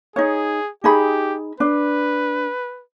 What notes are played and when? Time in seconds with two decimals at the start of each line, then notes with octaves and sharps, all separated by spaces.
0.16 D#4 G#4 C#5
0.84 D#4 G4 G#4 B5
1.60 D4 B4